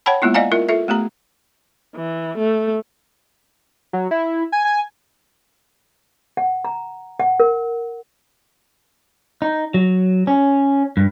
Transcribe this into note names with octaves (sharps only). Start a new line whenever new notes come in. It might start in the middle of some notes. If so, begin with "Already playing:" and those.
C#5 F#5 G5 A5 B5
G#3 A#3 B3 E4 F4
D5 D#5 F5 F#5 G#5 A#5
E4 F4 A#4 E5
F4 A4 E5
A3 B3 G4 A#5
E3
A3
F#3
E4
G#5
G#5
F#5
A#5
F#5
A#4
D#4
F#3
C#4
G2